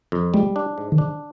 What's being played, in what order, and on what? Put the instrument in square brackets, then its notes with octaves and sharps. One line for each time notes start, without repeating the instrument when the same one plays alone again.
[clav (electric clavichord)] F2
[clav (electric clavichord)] G3 [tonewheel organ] G#3
[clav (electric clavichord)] D4
G#2
[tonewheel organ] D#3
[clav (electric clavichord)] D4